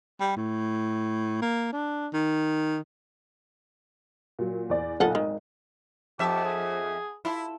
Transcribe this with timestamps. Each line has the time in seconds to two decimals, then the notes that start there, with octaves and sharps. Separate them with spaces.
0.20 G3
0.37 A2
1.42 A#3
1.73 D4
2.14 D#3
4.39 A#2 F#3
4.70 E2 D5
5.00 B1 A#2 D#4 F4 A4 F#5
5.15 G#1 D#3
6.19 F2 B3 D#4 G4 E5 A5
6.44 G#4
7.25 E4 F4 G4 A4